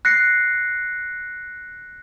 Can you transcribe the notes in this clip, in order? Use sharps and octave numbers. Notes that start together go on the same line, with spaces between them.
F#6 A#6 C7 C#7